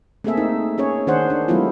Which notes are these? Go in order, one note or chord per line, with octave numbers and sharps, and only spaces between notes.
A3 A#3 C4 G#4 A4 E5
D#4
C#4 G#4 C#5
D#3 D4 G#4 C5 F#5
D4
F#3 G#3 A3 B3 E4 F4